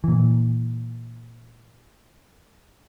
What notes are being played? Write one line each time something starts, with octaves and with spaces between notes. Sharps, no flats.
A#2 E3